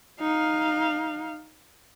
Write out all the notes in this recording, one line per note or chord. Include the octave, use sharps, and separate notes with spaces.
D#4 F5